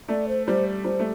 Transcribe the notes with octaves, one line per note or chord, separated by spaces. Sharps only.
A3 D5
C5
G3 C5
G3 C5
A3